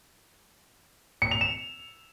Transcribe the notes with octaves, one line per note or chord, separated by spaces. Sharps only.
C#7
F7
E7